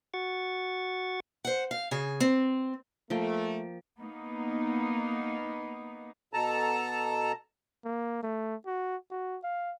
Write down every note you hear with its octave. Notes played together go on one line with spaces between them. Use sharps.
F#4 F#5 C#6 A6
C5 F#5
F5
C#3 G#4
C4
F3 A3 A#3 G5
A#3 B3 D#4
B2 A4 A5 A#5
A#3
A3
F#4
F#4
F5